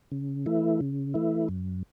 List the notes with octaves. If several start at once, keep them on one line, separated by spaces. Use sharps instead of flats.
C#3
E3 A3 E4
C#3
E3 A3 E4
F#2